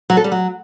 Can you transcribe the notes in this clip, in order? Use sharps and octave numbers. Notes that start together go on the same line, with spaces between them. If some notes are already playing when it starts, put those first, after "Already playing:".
F#3
A4
G3
F#3